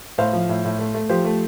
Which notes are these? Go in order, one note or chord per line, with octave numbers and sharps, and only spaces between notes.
A2 C5 F5
F3
A2
A2
A3
A3
F3 G4 C5
A3